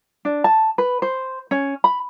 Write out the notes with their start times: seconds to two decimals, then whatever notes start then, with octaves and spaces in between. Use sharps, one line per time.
0.25 D4
0.44 A5
0.78 B4
1.02 C5
1.51 C#4
1.84 B5